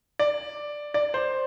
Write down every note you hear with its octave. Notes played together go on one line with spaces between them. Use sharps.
D5
D5
C5